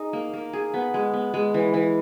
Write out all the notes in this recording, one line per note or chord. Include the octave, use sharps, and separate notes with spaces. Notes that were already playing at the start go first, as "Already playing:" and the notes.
Already playing: D#4 G#4
A#3
A#3
G#4
B3
G#3
B3
G#3
E3
E3